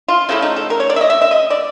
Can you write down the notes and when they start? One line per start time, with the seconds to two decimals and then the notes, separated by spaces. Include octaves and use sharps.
0.08 F4
0.29 C#3 F3 A3 E4
0.42 D#4
0.56 A4
0.70 A#4
0.80 C#5
0.90 D5
0.96 E5
1.01 D#5
1.10 E5
1.22 E5
1.31 D#5
1.50 D5